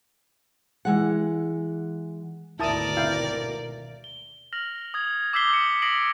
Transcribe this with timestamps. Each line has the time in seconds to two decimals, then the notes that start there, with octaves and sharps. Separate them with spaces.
0.85 E3 G#3 F#5
2.59 G#1 D2 B2 E4 A#4 D5 A5 D#6
2.97 E4 F5 G5
4.04 G7
4.53 F6 A#6 F7 F#7
4.94 D#6 G#6
5.33 D6 E6 G6 B6 C7 G7
5.53 C#7
5.82 D#6 A#6 C7 D7 F#7